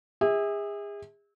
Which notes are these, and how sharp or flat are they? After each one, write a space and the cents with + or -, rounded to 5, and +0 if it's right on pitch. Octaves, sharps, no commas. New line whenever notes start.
G#4 -35 E5 -30